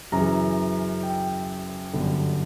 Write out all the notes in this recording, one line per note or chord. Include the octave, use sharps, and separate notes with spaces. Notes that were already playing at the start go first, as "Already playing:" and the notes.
F#2 C#3 E3 A#5
G5
G1 F#2 D3